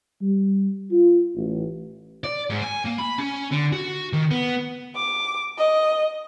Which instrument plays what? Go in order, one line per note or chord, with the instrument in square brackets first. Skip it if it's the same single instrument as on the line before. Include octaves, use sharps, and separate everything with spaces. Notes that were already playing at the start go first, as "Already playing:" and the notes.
[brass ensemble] G3
F4
A1
[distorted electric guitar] D5
G#2
G#5
A#3
B5
C#4
D3
F#4
D#3
B3
[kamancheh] D6
D#5